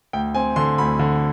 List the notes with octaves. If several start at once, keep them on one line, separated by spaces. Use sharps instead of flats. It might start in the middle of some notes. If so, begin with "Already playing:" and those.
D2 G5
C4 G#5
D3 C6
D2 B5
D3